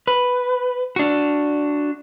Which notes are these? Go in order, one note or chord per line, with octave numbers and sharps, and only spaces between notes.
B4
D4 F#4